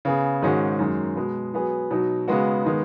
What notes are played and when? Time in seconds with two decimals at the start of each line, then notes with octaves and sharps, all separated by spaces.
0.05 C#3 B3 G#4
0.42 G#2 D#3 G#3 C#4 F#4
0.79 F#2 D#3 G#3
1.16 B2 G#3 B3
1.54 F#3 B3 G#4
1.91 B2 F#3 D#4
2.28 C#3 G#3 B3 F#4
2.65 D#3 G#3 B3